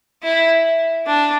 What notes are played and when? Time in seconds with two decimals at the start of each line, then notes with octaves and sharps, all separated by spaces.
0.23 E4
1.07 D4